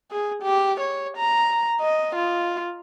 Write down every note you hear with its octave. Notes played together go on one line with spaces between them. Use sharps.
G#4
G4
C#5
A#5
D#5
F4